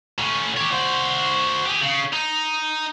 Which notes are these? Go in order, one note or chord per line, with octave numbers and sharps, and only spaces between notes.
A2 C#4
G4 C#5
F#4 C5
G4 G#4
C#3
D#4